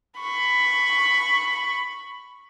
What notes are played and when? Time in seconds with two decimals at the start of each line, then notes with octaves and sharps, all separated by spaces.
0.20 B5 C#6